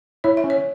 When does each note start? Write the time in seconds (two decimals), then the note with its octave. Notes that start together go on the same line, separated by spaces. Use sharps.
0.24 E4 C#5
0.37 E5
0.44 C#4
0.50 C#5